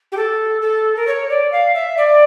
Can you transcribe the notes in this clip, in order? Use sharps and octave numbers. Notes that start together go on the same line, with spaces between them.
G4
A4
A4
A#4
C#5
D5
F5
E5
D5